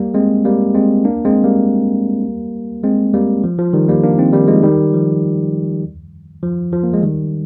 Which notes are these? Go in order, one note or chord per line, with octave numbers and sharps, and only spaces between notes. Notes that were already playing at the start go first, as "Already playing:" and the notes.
Already playing: G3 A#3
G#3 C4
G3 A#3
G#3 C4
A#3 D4
G#3 C4
G3 A#3
G#3 C4
G3 A#3
F3
F3
D#3 G3
G3 A#3
A#3 D4
C4 D#4
D#3 G3
F3 G#3
D#3 G3
F3
F3
F3
A#3
G#3
D#3 G3